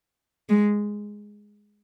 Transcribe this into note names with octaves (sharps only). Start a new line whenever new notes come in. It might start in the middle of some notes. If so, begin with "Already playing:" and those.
G#3